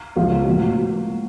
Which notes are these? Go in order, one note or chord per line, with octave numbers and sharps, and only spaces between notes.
C#2 C#3 F3 G#3 C4 F4
A2 F3 A#3 F#4